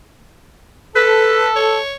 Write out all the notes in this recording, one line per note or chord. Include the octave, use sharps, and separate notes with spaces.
A4 B4
C#5